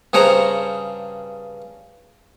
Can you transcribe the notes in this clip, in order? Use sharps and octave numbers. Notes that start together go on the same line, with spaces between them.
G2 C#3 G#4 C5 F#5 A#5